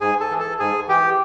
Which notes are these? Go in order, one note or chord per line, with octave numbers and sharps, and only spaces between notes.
G#2 G#4 G#5
A4 A5
E3
A4 A5
G#2 G#4 G#5
E3 G4 G5